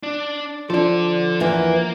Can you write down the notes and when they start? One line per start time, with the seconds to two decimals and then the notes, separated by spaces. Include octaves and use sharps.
0.03 D4
0.70 F3 D4 A4 D5
1.40 E2 E3 A#3